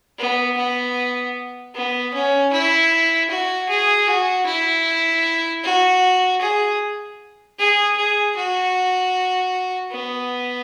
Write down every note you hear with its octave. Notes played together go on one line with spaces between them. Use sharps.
B3
B3
B3
C#4
E4
F#4
G#4
F#4
E4
F#4
G#4
G#4
G#4
F#4
B3